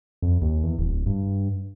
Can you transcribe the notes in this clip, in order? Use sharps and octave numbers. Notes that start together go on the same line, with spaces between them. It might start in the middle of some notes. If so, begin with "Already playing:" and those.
F2
D#2
E2
D1
G2